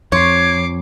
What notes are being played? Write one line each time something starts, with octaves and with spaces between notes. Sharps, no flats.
F2 C#5 D6 G#6 C7